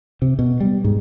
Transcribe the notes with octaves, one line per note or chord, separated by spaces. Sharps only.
C3
B2
G3
G#2